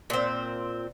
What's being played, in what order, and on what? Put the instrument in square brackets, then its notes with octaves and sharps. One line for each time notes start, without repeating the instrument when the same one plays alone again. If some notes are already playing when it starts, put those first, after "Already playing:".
[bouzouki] A#2 C4